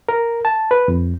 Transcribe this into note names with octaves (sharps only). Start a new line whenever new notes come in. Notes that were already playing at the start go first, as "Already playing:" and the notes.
A#4
A5
B4
F2